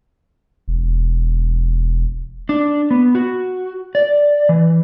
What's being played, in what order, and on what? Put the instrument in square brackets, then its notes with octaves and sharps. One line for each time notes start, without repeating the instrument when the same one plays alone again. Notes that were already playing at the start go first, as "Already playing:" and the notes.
[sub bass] E1
[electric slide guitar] D4
B3
F#4
D5
E3